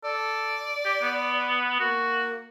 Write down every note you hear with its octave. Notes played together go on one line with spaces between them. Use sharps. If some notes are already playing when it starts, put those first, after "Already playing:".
A4 D5
G4
B3
A#3 F#4